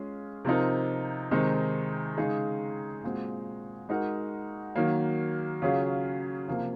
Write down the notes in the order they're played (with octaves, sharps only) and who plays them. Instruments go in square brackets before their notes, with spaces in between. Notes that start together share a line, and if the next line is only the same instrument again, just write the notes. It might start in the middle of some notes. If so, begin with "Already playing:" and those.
Already playing: [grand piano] G#3 C#4 F4 G#4
C3 F3 C4 D#4 A#4
C3 D#3 G#3 C4 D#4
C#3 G#3 D#4 G#4
A#2 G#3 C4 F#4
G#3 D#4 F#4 A#4
D#3 F#3 A#3
C#3 F#3 C#4 F4 G#4
C3 F3 A#3